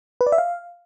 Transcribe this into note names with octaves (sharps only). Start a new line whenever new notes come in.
B4
D5
E5
F5